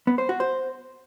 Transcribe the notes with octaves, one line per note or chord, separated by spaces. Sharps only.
B3
C5
F#4
C5